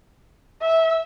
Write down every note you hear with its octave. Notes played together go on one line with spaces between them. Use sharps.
E5